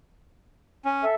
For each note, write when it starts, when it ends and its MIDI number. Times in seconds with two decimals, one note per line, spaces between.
0.85 1.05 61
1.04 1.15 69
1.04 1.15 76